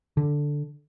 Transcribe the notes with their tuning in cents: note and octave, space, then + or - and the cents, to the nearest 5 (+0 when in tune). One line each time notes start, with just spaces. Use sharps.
D3 +0